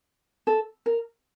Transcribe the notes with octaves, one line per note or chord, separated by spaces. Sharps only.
A4
A#4